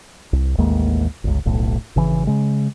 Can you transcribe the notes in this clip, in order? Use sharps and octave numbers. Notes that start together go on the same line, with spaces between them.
C2
A1 D#2 G#3 A#3
G1 C#2
D#1 B1 A2
G#1 C#3 E3
C#3 G#3